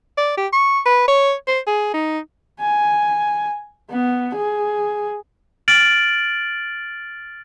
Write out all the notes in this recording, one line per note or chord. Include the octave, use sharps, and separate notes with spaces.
D5
G4
C#6
B4
C#5
C5
G#4
D#4
G#5
B3
G#4
F6 A6 D7 F#7